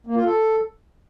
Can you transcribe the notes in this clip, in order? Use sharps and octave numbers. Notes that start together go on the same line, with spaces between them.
A#3
F4
A4